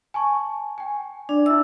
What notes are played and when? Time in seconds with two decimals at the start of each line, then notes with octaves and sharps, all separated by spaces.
0.14 G#5 A5 C#6
0.78 G5 G#5
1.29 D4 D5
1.46 E4 E5 E6